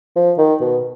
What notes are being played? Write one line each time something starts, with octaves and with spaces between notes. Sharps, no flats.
F3
D#3
B2